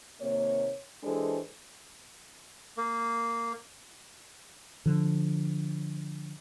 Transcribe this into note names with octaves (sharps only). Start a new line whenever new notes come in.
D#2 C3 A#3 C#5
E3 G#3 D4 G4 A4 C5
A#3
D3 F3